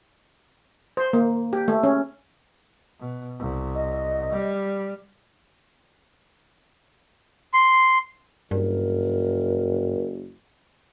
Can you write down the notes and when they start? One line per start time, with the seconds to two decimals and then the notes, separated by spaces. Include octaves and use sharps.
0.97 C5
1.13 A#3
1.53 G4
1.68 A3
1.83 C#4
3.00 B2
3.39 C2
3.75 D#5
4.33 G3
7.54 C6
8.51 F#1 G2 A#4